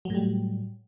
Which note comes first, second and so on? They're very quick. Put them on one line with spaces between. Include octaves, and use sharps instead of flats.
F#3 A2 G3